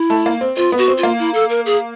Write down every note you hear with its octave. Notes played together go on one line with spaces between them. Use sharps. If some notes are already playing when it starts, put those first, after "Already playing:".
Already playing: E4
A3
A#3
C4
C4 F4
B3
F#4
C4
F4
A#3
E4
A4
A#4
G#4